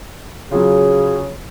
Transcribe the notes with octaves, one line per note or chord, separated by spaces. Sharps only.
C#3 F#3 F4 G#4